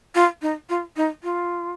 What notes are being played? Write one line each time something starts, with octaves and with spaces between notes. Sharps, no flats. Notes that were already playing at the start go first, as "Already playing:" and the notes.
F4
D#4
F4
D#4
F4